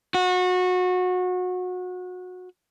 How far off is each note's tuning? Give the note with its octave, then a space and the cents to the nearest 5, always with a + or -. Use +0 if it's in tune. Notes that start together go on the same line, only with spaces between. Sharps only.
F#4 -25